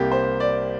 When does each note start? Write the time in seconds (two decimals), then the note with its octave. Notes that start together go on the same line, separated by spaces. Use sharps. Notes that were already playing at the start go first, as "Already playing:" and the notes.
Already playing: C2 C3 A#3 G4
0.12 C5
0.40 D5